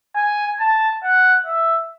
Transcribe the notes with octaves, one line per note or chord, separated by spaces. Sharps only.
G#5
A5
F#5
E5